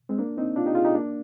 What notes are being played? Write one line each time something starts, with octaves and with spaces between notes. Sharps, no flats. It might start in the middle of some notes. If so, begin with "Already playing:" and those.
G#3 C4
A#3 D4
C4 D#4
D4 F4
D#4 G4
F4 G#4
D#4 G4
A#3 D4